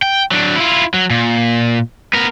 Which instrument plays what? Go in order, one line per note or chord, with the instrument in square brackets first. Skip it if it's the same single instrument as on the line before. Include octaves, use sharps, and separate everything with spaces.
[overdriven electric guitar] G5
F#3 D4
E4 F4
F#3
A#2
B3 A#4